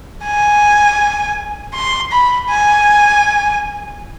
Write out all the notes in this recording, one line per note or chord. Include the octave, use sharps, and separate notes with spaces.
G#5
C6
B5
G#5